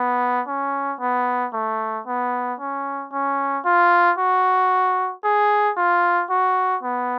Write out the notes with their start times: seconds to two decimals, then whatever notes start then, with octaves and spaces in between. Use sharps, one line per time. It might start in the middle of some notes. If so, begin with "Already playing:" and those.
Already playing: B3
0.47 C#4
1.00 B3
1.53 A3
2.07 B3
2.60 C#4
3.12 C#4
3.65 F4
4.18 F#4
5.24 G#4
5.77 F4
6.30 F#4
6.83 B3